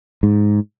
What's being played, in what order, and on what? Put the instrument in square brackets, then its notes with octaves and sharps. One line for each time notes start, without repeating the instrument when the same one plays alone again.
[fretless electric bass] G#2